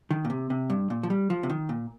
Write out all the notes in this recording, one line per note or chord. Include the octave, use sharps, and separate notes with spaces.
D#3
A#2
C3
C3
G2
A#2
F3
G3
F3
C3
D#3
A#2